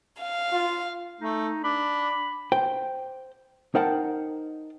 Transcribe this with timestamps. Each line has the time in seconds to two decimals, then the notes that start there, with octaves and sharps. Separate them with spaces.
0.20 F5
0.52 F4
1.21 A3 D#4
1.64 D4 B5
2.52 C5 G5
3.75 D#4 A#4 C5 F#5 G5 A5